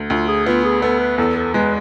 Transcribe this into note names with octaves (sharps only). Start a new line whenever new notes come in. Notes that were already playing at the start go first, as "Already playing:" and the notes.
Already playing: D2
D2 F4
G#4
B3 F4
G#4
B3 A4
B4
E2 A4
A4
G#3 B4